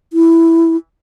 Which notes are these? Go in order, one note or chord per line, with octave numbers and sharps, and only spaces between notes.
E4